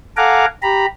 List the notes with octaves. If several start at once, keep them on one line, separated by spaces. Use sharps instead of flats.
A4 F5 F#5 G#5 A#5 D6
G4 A#5 B5